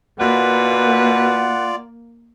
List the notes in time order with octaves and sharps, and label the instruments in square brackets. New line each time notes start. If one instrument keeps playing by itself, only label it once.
[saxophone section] B2 E4 B4 [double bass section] A#3 [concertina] F4 D5 [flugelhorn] F#5